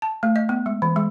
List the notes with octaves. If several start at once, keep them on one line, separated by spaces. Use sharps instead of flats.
A5
A3
D#5
B3
G#3
E3
G#3